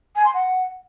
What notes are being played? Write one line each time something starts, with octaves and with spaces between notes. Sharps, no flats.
G#5
C6
F#5